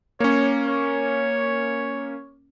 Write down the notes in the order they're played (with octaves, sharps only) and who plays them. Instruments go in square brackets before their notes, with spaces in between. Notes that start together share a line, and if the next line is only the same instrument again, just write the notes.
[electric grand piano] A#3 C#4 [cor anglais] C#5
[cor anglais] C#5